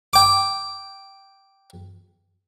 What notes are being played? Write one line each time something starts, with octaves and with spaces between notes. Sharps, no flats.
G5 D6